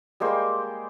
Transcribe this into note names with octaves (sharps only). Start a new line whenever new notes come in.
G3 G#3 A#3 C5